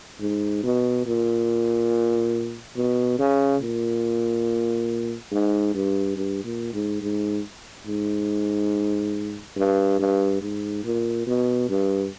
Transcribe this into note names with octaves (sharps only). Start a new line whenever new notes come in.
G#2
B2
A#2
B2
C#3
A#2
G#2
G2
G2
A#2
G#2
G#2
G#2
G2
G2
G#2
A#2
B2
G2